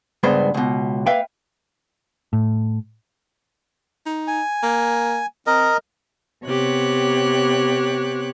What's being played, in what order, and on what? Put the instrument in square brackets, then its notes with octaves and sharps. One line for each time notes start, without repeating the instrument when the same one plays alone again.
[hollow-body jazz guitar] C#2 G2 C#3 B3 C5 B5
C#2 B2
A#3 B4 E5 F5 G5
[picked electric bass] A2
[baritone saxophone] D#4
[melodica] G#5
[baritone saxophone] A#3
[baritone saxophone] C4 [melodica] A#4 D#5
[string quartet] C3 B3 G4 C#5 F#6